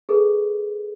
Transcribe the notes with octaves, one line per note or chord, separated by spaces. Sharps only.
G#4 A4 B4